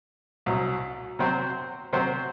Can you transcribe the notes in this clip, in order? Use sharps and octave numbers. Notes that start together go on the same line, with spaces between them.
C2 B2 F#3
C3 F#3 C4 F#4 C5
C3 F#3 C4 F#4 C5